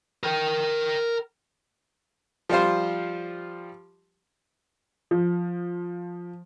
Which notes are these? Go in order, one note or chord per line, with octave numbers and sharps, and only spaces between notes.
A#4 G5
F3 G3 F4 C5
F3